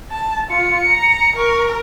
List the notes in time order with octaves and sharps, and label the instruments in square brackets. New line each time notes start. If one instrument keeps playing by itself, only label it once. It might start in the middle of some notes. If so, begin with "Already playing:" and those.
[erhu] A5
[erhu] F4 [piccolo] C#7
[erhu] A#5
[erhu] A#4 [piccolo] C#6